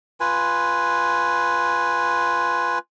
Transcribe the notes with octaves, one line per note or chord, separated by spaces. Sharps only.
F4 B4 G#5